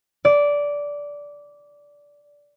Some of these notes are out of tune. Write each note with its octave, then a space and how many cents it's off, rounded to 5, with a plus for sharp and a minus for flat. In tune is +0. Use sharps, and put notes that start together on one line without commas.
D5 -15